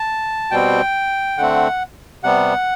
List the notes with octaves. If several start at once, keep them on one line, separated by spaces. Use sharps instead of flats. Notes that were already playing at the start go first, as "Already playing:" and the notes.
Already playing: A5
B2 G3 C4 G5
D3 A3 C4 F#5
C3 G3 B3 F#5